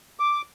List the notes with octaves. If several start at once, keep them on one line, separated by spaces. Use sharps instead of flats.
D6